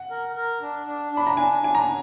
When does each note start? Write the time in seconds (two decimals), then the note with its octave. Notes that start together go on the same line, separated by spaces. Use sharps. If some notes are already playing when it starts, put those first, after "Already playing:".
Already playing: F#5
0.11 A#4
0.36 A#4
0.61 D4
0.87 D4
1.12 D4 B5
1.27 A#5
1.37 D4 G#5
1.62 D4 G#5
1.75 A#5